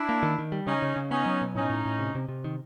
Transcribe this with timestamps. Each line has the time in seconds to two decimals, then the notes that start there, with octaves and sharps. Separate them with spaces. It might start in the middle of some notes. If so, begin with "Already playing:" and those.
Already playing: D4 E4
0.09 A#3
0.23 D#3
0.38 D#3
0.52 G3
0.67 C#3 C#4 D#4
0.82 C#3
0.96 C#3
1.11 B3 C#4 D#4
1.26 F#3
1.41 B2
1.55 A2 C#4 D#4
1.70 A2
1.86 A2
1.99 C3
2.15 C3
2.29 C3
2.44 D#3